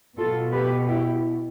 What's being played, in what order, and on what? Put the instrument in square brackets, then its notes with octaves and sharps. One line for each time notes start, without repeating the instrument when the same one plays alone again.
[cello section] B2 F4 A4
G4 B4
E4 G4